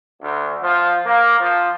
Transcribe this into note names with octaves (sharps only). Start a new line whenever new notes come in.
D2
F3
A#3
F3